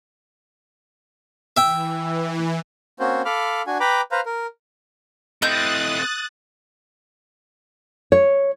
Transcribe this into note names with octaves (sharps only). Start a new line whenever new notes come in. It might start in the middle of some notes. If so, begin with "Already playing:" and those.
E3 E5 G5
A#3 C4 C#4 F#4 C5
A4 F5 B5 D6 F6
D4 F#4 G#5
B4 G5 A#5 B5 D6
B4 C5 F5 A#5
A#4
A3 C4 E4 D#5 D#6 F#6 G6 A6
C#5